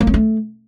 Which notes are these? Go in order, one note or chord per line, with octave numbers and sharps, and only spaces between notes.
A#3
C#4
A3